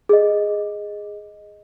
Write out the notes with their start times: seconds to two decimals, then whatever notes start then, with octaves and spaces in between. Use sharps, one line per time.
0.09 G#4 D#5